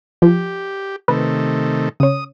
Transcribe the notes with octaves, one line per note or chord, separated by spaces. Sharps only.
F3 G4
C3 D#3 A3 B4
C#3 C#5 D#6